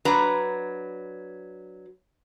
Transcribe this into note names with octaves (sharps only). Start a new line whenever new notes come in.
F#3 D4 B4 A#5